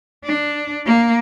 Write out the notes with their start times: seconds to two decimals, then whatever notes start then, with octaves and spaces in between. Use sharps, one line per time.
0.25 D4
0.86 A#3